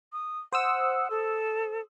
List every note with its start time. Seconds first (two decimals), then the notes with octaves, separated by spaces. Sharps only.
0.13 D#6
0.52 C5 F#5 D#6 E6
1.10 A4